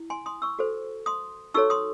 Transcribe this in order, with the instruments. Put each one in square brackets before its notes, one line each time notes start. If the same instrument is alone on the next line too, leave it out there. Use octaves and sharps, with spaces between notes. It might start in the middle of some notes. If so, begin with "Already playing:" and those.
Already playing: [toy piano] E4
G#5 C6
C6 D#6
C#6 E6
F#4 A4 C5
C6 D#6
D#4 F#4 A4 C#5 C#6 E6
C6 D#6